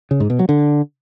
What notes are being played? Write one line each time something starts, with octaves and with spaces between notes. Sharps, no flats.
C#3
G#2
B2
F#3
D3